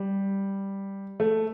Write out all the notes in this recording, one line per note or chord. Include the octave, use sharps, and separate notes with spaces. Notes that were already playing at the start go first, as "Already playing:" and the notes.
Already playing: G3
A3